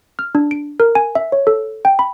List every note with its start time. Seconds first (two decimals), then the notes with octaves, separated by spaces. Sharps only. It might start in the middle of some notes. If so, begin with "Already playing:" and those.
0.19 F6
0.35 D4
0.51 D7
0.80 A#4
0.95 G#5
1.15 E5
1.32 C#5
1.47 A4
1.85 G5
1.99 B5